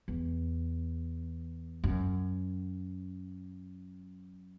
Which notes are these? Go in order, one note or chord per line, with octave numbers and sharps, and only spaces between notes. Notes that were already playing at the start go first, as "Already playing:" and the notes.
E2
F#2